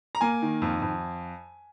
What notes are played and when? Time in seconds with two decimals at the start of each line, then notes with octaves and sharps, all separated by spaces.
0.15 A#5
0.21 A#3 G#5
0.42 D#3
0.62 F2
0.82 F2